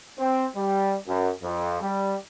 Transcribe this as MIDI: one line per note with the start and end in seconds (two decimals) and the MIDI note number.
0.18 0.45 60
0.56 0.96 55
1.07 1.29 42
1.42 1.79 41
1.81 2.14 55